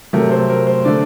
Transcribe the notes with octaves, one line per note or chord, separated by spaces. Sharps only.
C3 F#3 A3 A#4
C5
A#4
C5
D3 A3 D5